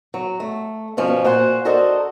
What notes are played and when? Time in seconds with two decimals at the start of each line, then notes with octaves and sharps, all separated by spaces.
0.14 F#3
0.40 A3
0.97 G2 B2 F3 C#4
1.24 A#2 F#4 C5 F#5 G#5
1.65 D4 F#4 A4 A#4 C5 D#5